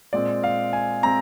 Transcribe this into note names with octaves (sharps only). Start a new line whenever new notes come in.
A#2 G#3 C4 D5
F5
G#5
G#3 C4 A#5